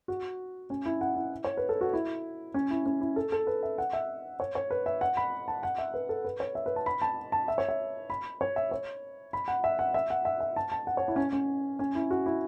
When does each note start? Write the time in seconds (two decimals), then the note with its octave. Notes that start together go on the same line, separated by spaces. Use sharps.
0.08 F#4
0.70 C#4
0.86 E4
1.01 F#5
1.16 E4
1.44 C#5
1.57 B4
1.69 A4
1.81 F#4
1.93 E4
2.54 C#4
2.71 E4
2.86 C#4
3.01 E4
3.16 A4
3.32 A4
3.47 B4
3.63 E5
3.78 F#5
3.93 E5
4.40 C#5
4.55 C#5
4.71 B4
4.86 E5
5.01 F#5
5.17 B5
5.48 A5
5.63 F#5
5.78 E5
5.94 B4
6.09 A4
6.25 B4
6.40 C#5
6.55 E5
6.66 B4
6.76 A5
6.86 B5
7.02 A5
7.32 A5
7.48 E5
7.58 C#5
7.69 E5
8.10 B5
8.41 C#5
8.56 E5
8.71 C#5
9.33 B5
9.48 F#5
9.64 E5
9.79 F#5
9.94 E5
10.10 F#5
10.25 E5
10.40 E5
10.56 A5
10.72 A5
10.87 F#5
10.97 C#5
11.08 E4
11.16 C#4
11.33 C#4
11.79 C#4
11.95 E4
12.11 F#4
12.26 E4